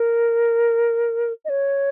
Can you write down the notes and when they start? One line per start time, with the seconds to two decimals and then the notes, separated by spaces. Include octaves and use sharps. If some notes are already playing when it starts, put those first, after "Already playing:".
Already playing: A#4
1.45 D#5
1.49 C#5